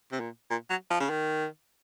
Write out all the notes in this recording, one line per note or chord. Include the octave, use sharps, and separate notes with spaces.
C3
A#2
A#2
F#3
F3
C#3
D#3